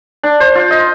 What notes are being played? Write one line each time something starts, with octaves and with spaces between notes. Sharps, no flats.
D4
C5
F4
D#5